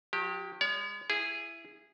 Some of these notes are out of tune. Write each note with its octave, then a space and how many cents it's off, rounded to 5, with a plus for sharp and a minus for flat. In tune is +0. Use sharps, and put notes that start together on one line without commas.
F#3 -45 G4 +0
G#3 -30 C#5 +45
E4 +20 G#4 -10